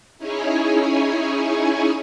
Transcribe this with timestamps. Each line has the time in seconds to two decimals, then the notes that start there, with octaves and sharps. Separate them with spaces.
0.18 C#4 D#4 E4 G#4 C#5 G#5